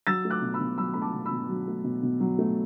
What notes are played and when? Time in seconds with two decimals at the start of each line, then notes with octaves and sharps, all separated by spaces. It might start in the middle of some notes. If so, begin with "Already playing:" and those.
0.07 F#3 E6 A6
0.25 A3
0.30 D6 F#6
0.42 B2
0.54 B5 E6
0.61 B2
0.78 F#3 B5 E6
0.94 A3 B5
1.01 A5 D6
1.14 B2
1.26 B5 E6
1.31 B2
1.49 F#3
1.68 A3
1.84 B2
2.03 B2
2.20 F#3
2.39 A3